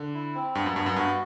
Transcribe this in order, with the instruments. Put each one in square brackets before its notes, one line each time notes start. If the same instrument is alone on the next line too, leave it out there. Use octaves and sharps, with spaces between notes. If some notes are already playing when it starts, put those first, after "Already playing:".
Already playing: [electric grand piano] D3
[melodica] E4
C4
[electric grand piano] G2 [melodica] B3
[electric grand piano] F#2
[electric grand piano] G2 [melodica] B3
[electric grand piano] F#2
[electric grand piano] G2 [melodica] F#4